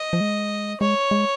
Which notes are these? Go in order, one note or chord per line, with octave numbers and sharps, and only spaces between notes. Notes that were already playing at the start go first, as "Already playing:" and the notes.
Already playing: D#5
F3
G#3
G#3 C#5
G#3